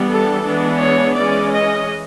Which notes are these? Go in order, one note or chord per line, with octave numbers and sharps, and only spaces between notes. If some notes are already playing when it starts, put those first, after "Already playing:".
Already playing: E3 G3 B3 D4
A4
E3 G#3 B3 D4
C#5
E3 G#3 C#4 D5
D#5